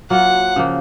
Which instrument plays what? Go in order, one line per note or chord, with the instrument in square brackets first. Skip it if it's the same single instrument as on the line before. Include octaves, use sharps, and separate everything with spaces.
[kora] F#3 A#3 F4 [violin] F#5
[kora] C#3 F3 A#3